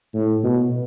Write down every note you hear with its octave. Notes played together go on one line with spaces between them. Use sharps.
A2
B2